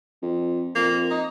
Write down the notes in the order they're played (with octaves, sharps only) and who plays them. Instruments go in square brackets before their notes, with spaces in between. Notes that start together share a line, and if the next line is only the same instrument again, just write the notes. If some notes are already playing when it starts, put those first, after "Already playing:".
[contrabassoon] F2
[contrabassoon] F2 [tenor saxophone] A#3
[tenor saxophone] D#4